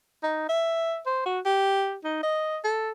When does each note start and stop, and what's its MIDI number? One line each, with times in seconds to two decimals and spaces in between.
0.23 0.48 63
0.49 0.99 76
1.06 1.24 72
1.25 1.40 66
1.45 1.96 67
2.04 2.20 63
2.23 2.59 75
2.64 2.91 69